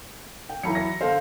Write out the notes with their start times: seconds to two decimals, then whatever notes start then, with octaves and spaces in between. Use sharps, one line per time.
0.50 G5
0.63 E3 F#3 A#5 B5 C#7
0.75 A#6
1.01 D3 A4 C5 F5